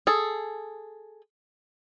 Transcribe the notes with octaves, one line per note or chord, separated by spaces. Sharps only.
G#4 A4